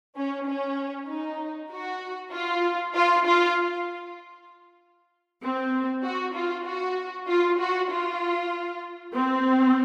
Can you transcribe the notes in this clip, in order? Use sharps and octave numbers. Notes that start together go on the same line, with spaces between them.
C#4
C#4
D#4
F#4
F4
F4
F4
C4
F#4
F4
F#4
F4
F#4
F4
C4